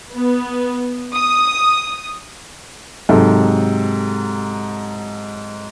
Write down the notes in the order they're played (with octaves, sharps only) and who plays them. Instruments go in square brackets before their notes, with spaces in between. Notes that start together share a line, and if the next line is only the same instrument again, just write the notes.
[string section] B3
D#6
[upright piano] G#2 C3 F#3 A4